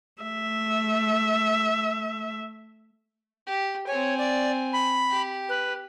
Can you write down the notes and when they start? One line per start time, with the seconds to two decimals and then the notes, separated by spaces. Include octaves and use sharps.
0.23 A3 E5
3.47 G4
3.87 C4 C#5 G#5
4.18 D5
4.73 B5
5.10 G4
5.49 B4